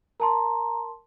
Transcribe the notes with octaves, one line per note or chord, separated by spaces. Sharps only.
A#4 A5 A#5 C6